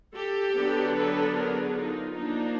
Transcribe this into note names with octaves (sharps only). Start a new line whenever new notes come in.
G4 A4
D3 F#3 B3 D4
A4 B4
G#4 A#4
D#4 F4
F3 A#3 D4 D#4